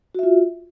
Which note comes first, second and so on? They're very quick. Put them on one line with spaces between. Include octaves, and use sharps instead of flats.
F#4 E5 F4